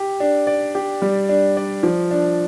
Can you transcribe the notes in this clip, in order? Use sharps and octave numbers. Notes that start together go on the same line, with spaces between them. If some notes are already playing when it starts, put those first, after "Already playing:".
Already playing: G4
D4
D5
G4
G3
D4
D5
F3
D4